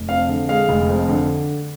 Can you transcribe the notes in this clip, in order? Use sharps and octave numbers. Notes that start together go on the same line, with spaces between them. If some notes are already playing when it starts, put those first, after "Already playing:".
Already playing: F1
F2 F5
D3
G#3 F5
F1
F2
D3